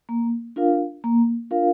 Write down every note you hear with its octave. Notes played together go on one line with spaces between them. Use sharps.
A#3
D4 F4 A#4 F5
A#3
D4 F4 A#4 F5